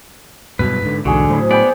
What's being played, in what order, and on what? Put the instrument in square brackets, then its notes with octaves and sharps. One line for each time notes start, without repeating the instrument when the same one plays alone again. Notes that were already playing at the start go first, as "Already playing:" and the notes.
[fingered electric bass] G2 B2 F#3 [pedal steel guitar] B4
[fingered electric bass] G#2 D3
[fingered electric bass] B1 E2 G#2 [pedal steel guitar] D3 [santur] F#4 G#4
[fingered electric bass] A2 F#3 [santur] C5 B5
[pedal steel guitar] B3 D5 [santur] G#4 G5 B5